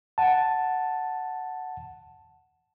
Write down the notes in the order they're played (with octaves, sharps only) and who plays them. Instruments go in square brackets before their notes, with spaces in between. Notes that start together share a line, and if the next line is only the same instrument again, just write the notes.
[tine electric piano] F#5 A5